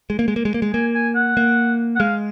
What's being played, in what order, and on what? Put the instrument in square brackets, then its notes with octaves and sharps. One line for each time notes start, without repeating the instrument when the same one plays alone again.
[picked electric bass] G#3
A#3
G#3
A#3
G#3
A#3
G#3
[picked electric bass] A#3 [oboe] G#5
[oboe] G#5
F#5
[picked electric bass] A#3
[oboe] F#5
[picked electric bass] G#3 [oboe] F5